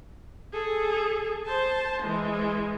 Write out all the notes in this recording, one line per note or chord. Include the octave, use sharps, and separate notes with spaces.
G#4 A4
C5 A5
E3 G#3